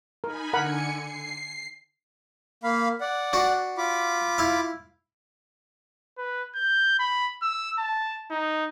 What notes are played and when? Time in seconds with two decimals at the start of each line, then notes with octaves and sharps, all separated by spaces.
0.24 D#4 A#4 G#5 B5
0.53 D3 A#4 F#5 G#5 B5 C#7
1.02 C7
2.64 A#3 F5 B5
3.01 D5 F#5
3.33 D4 F#4
3.78 F4 B5 D6
4.38 E4 F5
6.18 B4
6.55 G6
6.99 B5
7.42 E6
7.78 A5
8.30 D#4